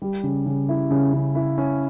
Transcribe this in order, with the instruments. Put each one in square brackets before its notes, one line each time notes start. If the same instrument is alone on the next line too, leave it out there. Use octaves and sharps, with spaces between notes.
[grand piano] G3
C#3
C#3
E4
C#3
C#3
E4
C#4